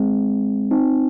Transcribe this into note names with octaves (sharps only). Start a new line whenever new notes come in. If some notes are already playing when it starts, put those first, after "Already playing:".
Already playing: G#3 C4
C4 D#4